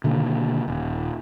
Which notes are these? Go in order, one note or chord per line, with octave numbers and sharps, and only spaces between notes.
B2 D3 D#3 A#3
D#1